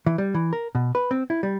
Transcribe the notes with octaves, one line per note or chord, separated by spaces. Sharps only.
E3
G3
E3
A#4
B2
B4
C4
E4
G3